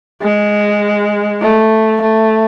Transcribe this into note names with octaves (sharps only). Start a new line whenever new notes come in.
G#3
A3
A3